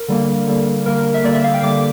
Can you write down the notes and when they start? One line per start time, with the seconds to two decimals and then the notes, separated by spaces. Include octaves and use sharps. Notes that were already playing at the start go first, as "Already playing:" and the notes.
Already playing: A#4
0.08 D3 G3 A#3
0.48 D3 G3 A#3
0.86 D3 G3 A#3 A#4
1.14 E5
1.24 D3 G3 A#3 D5
1.34 E5
1.44 F5
1.54 G5
1.62 D3 G3 A#3 D6